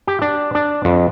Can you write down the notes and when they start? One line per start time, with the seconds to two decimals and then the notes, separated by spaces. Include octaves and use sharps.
0.07 G4
0.22 D4
0.55 D4
0.85 F2